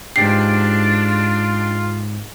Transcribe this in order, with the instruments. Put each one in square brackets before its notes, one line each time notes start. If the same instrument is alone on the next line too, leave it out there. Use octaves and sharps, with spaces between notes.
[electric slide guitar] G#2 B2 G4 [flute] D4 [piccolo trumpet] F4 [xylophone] C7